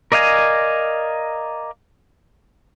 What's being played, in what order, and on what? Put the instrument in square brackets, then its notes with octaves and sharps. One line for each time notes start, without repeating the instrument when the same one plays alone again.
[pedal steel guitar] A#4 D5 D#5 F5 G#5